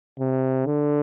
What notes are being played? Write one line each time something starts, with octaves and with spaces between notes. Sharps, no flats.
C3
D3